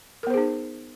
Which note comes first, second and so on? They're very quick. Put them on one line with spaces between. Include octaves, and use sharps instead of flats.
A#4 B3 C5 G#4 D#4